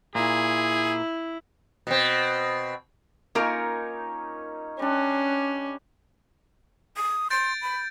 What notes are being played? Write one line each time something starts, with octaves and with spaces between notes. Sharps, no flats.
A#2 E4 G#4
B2 C4
A#3 C#4 D#4 F4 A#4 C#5
G3 C#4 D4
D#6
C6 G6 A6 D7
B5